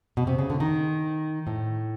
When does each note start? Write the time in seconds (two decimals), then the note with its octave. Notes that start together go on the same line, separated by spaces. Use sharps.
0.17 B2
0.27 C3
0.39 C#3
0.50 D3
0.60 D#3
1.47 A2